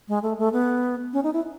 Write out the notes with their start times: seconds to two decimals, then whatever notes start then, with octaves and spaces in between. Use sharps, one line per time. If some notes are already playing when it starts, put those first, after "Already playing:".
0.08 G#3
0.23 A3
0.38 A3
0.53 B3
1.13 C#4
1.24 D#4
1.33 E4